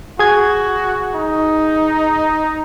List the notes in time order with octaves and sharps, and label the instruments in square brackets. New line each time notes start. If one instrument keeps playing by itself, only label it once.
[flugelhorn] F#4 [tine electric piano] G#4 G#6
[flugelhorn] D#4